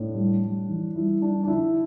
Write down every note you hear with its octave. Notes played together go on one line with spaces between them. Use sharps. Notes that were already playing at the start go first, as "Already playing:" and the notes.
Already playing: A2 D4
G3
G3
E3
G3 E4
G3 D4
D4
D3 E4